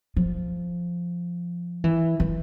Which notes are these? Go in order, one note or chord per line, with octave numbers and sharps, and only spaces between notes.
F3
E3
E3